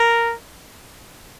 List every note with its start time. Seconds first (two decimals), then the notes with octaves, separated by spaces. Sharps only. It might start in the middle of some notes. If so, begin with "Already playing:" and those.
Already playing: A#4